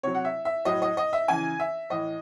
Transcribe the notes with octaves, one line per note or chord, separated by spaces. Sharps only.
C3 F#3 C#5
F#5
E5
E5
A2 F#3 D#5
D#5
D#5
E5
C#3 E3 G#5
E5
A2 E3 D#5